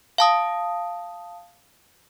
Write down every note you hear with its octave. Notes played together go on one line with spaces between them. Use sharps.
F5 A5 D#6